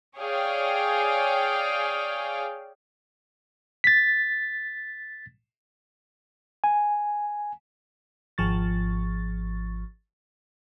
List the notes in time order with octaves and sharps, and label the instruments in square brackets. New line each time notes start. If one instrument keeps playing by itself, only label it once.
[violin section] G#4 C#5 D5 F5 G5
[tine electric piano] A6 B6
G#5
[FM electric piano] G#1 F3 C#6 A6